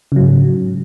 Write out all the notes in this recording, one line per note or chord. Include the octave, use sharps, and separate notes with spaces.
G#2 C#3 F#3